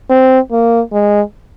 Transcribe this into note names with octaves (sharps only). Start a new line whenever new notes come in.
C4
A#3
G#3